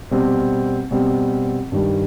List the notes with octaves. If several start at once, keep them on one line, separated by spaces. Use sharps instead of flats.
B2 G3 C4
B2 G3 C4
G2 D#3 G3